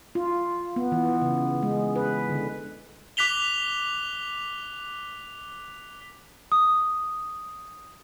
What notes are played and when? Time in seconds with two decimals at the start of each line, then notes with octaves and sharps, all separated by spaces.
0.15 F4
0.76 B3
0.92 E3
1.21 C#3
1.63 G#3
1.96 B4
2.30 D3
3.17 D6 F#6 B6 F7 G7
6.52 D#6